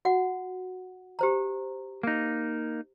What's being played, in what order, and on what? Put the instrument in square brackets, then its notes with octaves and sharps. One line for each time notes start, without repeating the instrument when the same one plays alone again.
[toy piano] F#4 F#5
G4 C5 A#5
[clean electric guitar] A#3 D#4